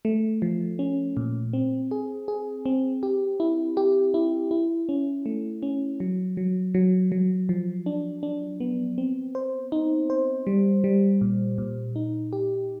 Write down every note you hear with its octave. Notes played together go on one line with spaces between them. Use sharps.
A3
F3
C#4
A#2
C4
G#4
G#4
C4
G4
E4
G4
E4
E4
C#4
A3
C#4
F#3
F#3
F#3
F#3
F3
D4
D4
B3
C4
C5
D#4
C5
G3
G3
A#2
A#2
D#4
G4